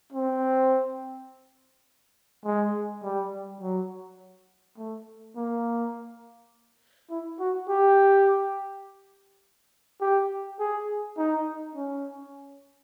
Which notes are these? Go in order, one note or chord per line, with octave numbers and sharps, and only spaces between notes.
C4
G#3
G3
F#3
A3
A#3
E4
F#4
G4
G4
G#4
D#4
C#4